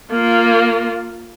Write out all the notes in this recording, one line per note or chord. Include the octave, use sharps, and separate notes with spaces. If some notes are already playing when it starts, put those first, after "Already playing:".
A#3 F4